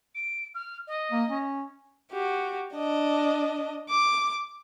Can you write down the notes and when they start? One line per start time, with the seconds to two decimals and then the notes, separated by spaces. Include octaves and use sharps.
0.15 D7
0.55 F6
0.87 D#5
1.11 A#3
1.29 C#4
2.12 F#4 G4
2.74 D4 D#5
3.90 D6